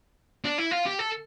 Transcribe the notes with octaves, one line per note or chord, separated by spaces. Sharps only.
D4
E4
F4
G4
A4